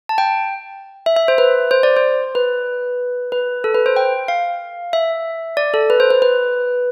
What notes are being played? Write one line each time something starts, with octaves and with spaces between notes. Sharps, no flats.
A5
G5
E5
E5
C5
B4
C5
D5
C5
B4
B4
A4
B4
C5
G5
F5
E5
D5
A4
B4
C5
B4
B4